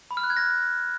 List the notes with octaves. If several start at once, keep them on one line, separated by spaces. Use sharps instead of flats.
B5
F6
F#6
G#6
A#6